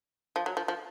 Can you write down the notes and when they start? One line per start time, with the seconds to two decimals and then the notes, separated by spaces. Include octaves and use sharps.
0.36 F3
0.46 F#3
0.57 F3
0.68 F3